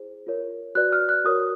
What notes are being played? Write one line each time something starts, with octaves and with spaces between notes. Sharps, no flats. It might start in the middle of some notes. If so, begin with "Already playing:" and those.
Already playing: E4 G#4 C5
F4 A#4 C#5
F#4 B4 D5 F#6
F6
F#6
F#4 A#4 C#5 D#6